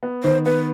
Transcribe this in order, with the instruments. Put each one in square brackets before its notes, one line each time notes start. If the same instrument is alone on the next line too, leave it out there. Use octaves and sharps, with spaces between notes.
[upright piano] B3
[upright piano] D#3 [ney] C5
[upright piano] B3 [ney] B4